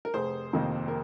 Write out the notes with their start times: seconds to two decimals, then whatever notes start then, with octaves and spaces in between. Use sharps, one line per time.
0.05 A#4
0.14 F1 G#4 C5
0.53 F2 C3 D#3 A#3
0.88 A#4